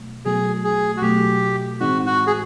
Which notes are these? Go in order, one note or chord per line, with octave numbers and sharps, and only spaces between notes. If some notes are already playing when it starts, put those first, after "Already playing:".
Already playing: B2 F#3 A3
B2 F#3 A3 G#4
G#4
F#4
B2 F#3 A3 G4
A2 E3 G#3 C4 D#4 F#4
F#4
G#4